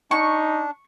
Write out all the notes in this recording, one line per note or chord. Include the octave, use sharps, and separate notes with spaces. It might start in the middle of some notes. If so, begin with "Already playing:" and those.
D4 D#4 C#6